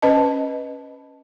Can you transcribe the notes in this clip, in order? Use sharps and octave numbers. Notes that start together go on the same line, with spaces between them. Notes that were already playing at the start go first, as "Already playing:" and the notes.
C#4 B4 C5 D#5 A5